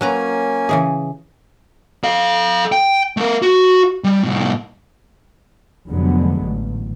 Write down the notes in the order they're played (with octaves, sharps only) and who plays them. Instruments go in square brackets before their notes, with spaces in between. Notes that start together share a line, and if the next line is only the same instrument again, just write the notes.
[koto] F#3 B4 A#5 [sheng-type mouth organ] A#3 C#4 G#5
[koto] C#3 E3 G#4
[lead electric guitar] A4 F5
G5
A3 A#4
F#4
G3
C2 A2
[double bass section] F1 D3 F#3 G#3 B3
A1